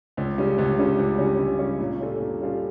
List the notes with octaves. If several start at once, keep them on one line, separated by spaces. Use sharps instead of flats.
C#2
C#3 G3 C#4
C#2
C#3 G3 C#4
C#2
C#3 G3 C#4
C#2
C#3 G3 C#4
A#2
G3 C#4 F4 A4
A#2
G3 C#4 F4 A4